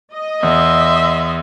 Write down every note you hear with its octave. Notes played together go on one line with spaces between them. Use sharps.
D#5
E2 E5 C6